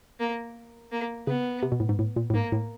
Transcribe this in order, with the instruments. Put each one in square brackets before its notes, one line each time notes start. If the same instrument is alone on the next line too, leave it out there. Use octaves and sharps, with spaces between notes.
[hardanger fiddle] A#3
A#3
[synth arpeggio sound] C#3 [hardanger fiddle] B3
[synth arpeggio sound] C3
B2
A2
G#2
A2
A#2
A2
[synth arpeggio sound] G#2 [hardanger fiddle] A#3
[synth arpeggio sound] A2